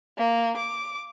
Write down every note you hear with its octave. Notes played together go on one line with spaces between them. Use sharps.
A#3
D6